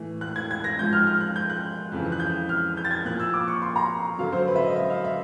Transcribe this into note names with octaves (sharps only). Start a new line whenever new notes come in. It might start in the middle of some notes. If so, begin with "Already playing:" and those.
Already playing: A2 E3
F#6
G#6
G#6
A#6
G#2 F3 G6
F6
F6
F#6
G6
F#6
F2 C#3 E3
F#6
G6
F6
G6
A6
G#6
A#2 F3 F#6
E6
D6
C#6
C6
A#5
F#2 D3 F#3 F5
C5
B4
E5
D#5
E5
F5
E5